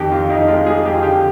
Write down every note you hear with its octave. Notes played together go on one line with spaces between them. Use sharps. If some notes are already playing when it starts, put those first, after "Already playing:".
Already playing: F2 D#3 G4
F2 F4
F2 D#4
G#3 F4
G#3 G#4
F2 G4
F4
D3 G4